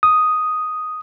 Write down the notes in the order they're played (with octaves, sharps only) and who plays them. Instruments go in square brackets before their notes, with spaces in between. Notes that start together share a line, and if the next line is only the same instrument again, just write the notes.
[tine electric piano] D#6